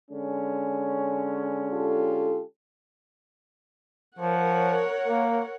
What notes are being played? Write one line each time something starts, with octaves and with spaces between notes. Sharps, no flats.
D3 G#3 C#4
F4 G4 A4
F3 A#4 C#5 F#5
A#3